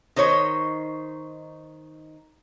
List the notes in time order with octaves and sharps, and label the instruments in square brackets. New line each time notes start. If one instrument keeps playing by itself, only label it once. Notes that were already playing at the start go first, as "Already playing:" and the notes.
[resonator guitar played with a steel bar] D#3 D#4 C5 C#5